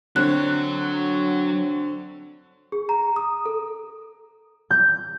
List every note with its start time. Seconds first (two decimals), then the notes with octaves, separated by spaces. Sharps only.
0.16 D3 F#3 C4 C#5 F#6
2.72 G#4
2.89 A#5
3.16 D#6
3.46 A4
4.71 G6